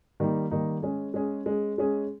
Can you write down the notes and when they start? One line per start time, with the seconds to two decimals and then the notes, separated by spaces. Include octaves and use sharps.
0.20 D#3 G3 A#3 D#4
0.51 D#3 G3 A#3 D#4
0.82 G#3 C#4 G#4
1.14 G#3 C#4 G#4
1.46 G#3 C#4 G#4
1.78 G#3 C#4 G#4